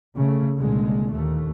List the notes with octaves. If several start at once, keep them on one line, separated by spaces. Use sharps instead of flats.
C#3 A3
C2 A#2 D3 G#3
D#2 A3